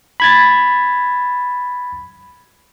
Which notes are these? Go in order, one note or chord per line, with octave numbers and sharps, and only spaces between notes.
B5 G#6 A6